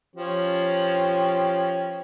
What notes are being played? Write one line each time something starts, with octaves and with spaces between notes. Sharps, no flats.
F3 C#4 G4